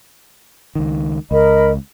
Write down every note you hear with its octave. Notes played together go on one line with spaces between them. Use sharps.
C#2 D#3
C#2 A#4 D#5 B5